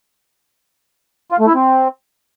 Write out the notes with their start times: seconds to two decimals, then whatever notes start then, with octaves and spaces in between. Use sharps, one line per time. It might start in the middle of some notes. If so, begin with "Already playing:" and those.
1.32 F4
1.39 A3
1.47 E4
1.54 C4